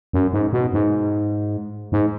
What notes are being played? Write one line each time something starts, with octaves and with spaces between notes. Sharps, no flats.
F#2
G#2
B2
G#2
G#2